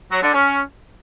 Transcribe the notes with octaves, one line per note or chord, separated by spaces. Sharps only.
F#3
D3
C#4